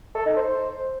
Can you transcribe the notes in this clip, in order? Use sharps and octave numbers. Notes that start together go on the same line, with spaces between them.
A4
D#4
C5